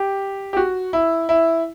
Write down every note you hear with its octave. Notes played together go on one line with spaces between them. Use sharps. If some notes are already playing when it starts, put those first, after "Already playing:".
Already playing: G4
G4
F#4
E4
E4